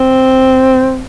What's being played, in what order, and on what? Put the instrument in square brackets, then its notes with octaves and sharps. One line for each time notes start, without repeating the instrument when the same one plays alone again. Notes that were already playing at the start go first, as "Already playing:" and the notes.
Already playing: [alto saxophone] C4